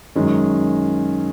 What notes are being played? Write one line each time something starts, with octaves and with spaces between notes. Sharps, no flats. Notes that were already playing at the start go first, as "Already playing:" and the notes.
F#2 D#3 G#3 C#4